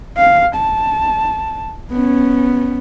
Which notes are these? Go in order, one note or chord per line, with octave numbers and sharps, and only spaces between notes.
F5
A5
B3 C#4